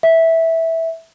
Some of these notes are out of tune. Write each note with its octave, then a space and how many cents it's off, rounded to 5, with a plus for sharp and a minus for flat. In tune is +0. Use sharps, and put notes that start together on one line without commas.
E5 -10